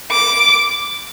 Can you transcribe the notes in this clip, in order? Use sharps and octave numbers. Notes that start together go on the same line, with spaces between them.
D6